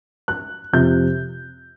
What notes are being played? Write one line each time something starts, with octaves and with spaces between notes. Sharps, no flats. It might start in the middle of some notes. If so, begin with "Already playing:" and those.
F#6
F2 C3 F3 G6